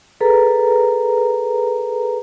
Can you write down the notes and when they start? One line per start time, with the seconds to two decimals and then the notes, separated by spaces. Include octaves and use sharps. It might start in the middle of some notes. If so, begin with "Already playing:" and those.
0.21 G#4 A4 B4 A#5